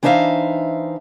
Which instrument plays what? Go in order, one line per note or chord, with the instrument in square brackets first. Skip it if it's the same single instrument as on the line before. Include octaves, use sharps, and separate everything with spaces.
[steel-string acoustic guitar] E3 D4 D#4 C5 E5 F5